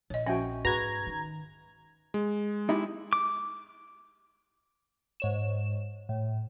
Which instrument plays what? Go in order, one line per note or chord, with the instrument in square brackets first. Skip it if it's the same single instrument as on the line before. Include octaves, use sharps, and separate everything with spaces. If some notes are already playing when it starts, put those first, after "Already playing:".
[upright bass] A#1 [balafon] C#5 D#5
[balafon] F3 C#4 E5 [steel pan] F#4 G5 G#5
[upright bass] G#2 [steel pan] F#4 G#4 B4 [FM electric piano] A#5 G#6
[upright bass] D#3
[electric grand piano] G#3
[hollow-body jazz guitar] D#4 E4 G4
[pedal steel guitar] D6
[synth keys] G#2 C#5 E7
A2